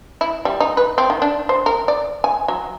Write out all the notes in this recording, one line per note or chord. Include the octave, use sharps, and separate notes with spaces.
E4
G3
D#4
B4
C4
D#3
D4
C5
A#4
D5
G#5
F#3